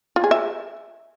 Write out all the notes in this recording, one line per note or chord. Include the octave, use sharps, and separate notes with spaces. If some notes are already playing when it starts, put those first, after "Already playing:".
F4
G#4
E5